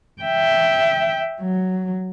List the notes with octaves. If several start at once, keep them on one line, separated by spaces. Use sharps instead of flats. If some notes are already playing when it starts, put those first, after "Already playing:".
E5 G5
F#3